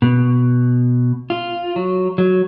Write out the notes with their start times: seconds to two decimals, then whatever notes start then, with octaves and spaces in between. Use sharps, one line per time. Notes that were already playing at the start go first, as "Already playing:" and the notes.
0.02 B2
1.30 F4
1.76 F#3
2.18 F#3